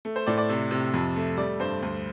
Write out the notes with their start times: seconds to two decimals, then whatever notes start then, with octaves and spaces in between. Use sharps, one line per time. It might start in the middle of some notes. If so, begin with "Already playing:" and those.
0.05 A3
0.16 C5
0.27 A2 D5
0.38 D5
0.49 C3
0.71 C3
0.94 F2
1.16 A3
1.37 G3 D5
1.60 G2 C5
1.82 D2